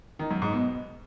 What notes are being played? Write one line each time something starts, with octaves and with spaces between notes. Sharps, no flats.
D#3
F#2
G#2
B2